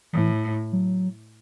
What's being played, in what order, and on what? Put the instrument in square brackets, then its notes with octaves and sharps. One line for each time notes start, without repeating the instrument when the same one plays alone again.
[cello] A2 [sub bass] E3
[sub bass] F#3